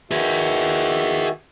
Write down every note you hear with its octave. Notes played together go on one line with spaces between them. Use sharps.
D#3 F#4 G#4 B4 E5